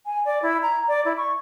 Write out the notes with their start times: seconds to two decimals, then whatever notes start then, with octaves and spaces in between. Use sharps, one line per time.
0.06 G#5
0.25 D5
0.43 E4
0.62 A#5
0.88 D5
1.05 E4
1.17 C#6